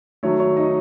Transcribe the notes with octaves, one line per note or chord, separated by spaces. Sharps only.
D#3 F#3 A3 C#5
C#5
D#4 D#5